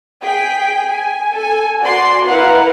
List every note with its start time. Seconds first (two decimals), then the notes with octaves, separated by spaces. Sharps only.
0.21 G#4 G5 B6
0.88 G#5
1.34 A4 G#5
1.80 F#4 D5 C6
2.26 E4 A#4 B4 F5 F#5